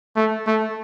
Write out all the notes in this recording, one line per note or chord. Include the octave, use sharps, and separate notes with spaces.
A3
A3